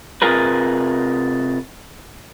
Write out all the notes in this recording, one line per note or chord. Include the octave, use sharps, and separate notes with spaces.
C3 F4 G#4 A#4 B4